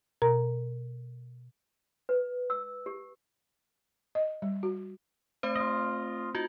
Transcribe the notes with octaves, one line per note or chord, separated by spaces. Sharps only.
B2 A#4 A#5
B4
E6
G4
D#5
G3
F#4
A3 C4 C5
F4 D#5
D#4 F4 F#4